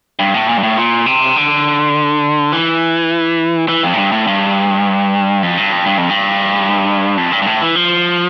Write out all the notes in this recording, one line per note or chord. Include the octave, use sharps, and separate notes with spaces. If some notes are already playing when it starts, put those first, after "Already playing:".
G2
A2
A#2
G2
A2
A#2
C3
D3
E3
E3
F2
A2
G2
A2
G2
F2
G2
F2
G2
F2
G2
F2
G2
G2
A2
E3
F3